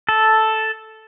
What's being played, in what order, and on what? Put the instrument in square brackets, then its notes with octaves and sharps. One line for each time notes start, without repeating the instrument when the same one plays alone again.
[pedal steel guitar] A4